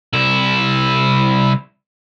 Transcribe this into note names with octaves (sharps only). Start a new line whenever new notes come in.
C2 E4